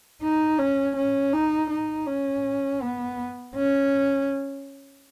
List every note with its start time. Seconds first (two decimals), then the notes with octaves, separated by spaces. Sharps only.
0.22 D#4
0.58 C#4
0.96 C#4
1.33 D#4
1.70 D#4
2.07 C#4
2.81 B3
3.55 C#4